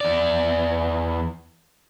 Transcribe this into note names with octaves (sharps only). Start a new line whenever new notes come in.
E2 D5